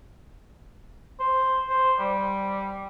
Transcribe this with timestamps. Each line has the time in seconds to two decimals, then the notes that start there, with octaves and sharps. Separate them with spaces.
1.20 C5
1.69 C5
1.99 G3